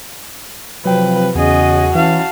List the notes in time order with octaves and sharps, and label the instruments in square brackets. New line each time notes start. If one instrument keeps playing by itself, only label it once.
[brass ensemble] C3 F3 [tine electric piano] F#3 G5 [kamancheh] B4
[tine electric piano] E2 [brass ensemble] C#3 [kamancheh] F#4 [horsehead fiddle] G#4 D#5
[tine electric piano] E3 [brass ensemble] C#4 E4 [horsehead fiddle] F5 A5